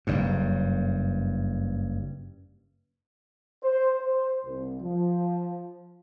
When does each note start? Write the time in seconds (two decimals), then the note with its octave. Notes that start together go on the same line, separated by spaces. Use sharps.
0.07 F#1 G2
3.63 C5
3.99 C5
4.45 C2
4.82 F3